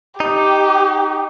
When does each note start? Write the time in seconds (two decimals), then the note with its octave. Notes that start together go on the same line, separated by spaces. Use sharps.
0.20 D#4 G4